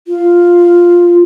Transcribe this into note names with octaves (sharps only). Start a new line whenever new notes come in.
F4